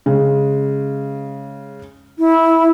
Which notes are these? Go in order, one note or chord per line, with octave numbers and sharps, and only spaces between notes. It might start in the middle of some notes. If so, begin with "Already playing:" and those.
C#3 G#3
E4